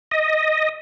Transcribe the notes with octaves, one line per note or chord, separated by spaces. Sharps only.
D#5